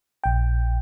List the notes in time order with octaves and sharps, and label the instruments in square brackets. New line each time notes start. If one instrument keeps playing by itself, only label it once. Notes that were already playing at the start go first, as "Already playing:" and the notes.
[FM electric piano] A#1 G5